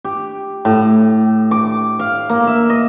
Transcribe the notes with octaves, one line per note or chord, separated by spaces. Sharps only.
G4
A2
D6
F5
A#3
E5
D#5